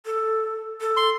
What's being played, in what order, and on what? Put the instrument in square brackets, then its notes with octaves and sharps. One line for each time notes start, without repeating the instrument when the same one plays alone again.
[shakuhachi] A4
A4
[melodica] C6